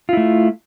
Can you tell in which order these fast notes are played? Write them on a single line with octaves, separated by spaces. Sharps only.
F4 E4 A3